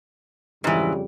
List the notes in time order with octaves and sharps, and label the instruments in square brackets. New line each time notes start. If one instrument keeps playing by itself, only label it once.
[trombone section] F2 C#3 G3 [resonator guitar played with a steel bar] G#2 E3